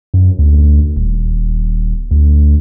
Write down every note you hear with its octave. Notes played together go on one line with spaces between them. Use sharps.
F#2
D2
D#1
D2